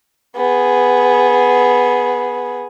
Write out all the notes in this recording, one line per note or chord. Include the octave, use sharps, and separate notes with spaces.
B3 G#4